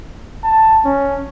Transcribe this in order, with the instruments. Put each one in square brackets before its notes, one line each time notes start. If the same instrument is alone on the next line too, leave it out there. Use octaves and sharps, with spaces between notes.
[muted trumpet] A5
C#4